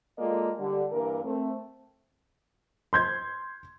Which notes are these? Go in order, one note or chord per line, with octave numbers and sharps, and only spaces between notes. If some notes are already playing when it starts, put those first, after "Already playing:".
G#3 A#3 F4 A4 D5 D#5
D3 G3
G2 E3 A#3 A#4
A3 C4
C6 G6 G#6